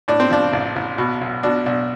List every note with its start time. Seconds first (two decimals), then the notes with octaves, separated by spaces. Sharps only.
0.08 A2 D4
0.20 C4
0.31 F3 D4
0.53 A1
0.76 A1
0.98 B2
1.21 B1
1.43 B2 D4
1.66 B1 D4